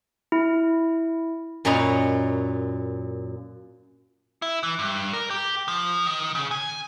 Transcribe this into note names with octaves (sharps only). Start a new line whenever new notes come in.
E4
F#2 A#2 C#5 D#5 A#5 B5
E4
E3
G2
A#4
G4
F3
D#3
C#3
G#5